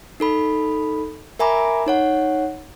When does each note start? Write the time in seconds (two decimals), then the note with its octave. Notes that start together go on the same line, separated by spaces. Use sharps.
0.20 D#4 A4 B5
1.39 A#4 E5 G#5 A#5 B5 D6
1.86 D#4 C#5 F#5